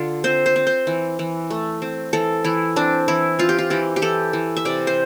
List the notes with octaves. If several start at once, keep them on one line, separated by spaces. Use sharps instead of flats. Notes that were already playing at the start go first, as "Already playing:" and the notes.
Already playing: D3 F4
C4 C5
C5
C4
C5
E3
E3
A3
C4
E3 A4
E3 E4
C4 D4
E3 E4
C4 F4
G4
F4
E3 G4
G4
E3 A4
E3
E5
C3 D5
C5